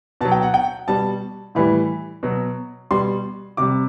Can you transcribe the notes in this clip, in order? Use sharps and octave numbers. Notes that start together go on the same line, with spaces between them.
B2 F#3 A5
G5
F#5
G5
B2 G3 A5
A2 E3 G3 B5
B2 F#3
B2 G3 C6
C3 G3 D6